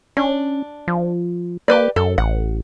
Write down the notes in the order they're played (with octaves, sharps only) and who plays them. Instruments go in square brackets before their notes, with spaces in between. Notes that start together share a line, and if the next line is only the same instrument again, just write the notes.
[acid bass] C#4 [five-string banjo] D4
[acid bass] F3
[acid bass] A#3 [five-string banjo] G4 B4 D5
[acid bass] F#2 [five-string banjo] A4
[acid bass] A1 [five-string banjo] F#5